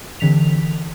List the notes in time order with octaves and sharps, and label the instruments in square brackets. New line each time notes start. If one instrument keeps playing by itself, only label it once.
[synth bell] D3 E3 B6 F7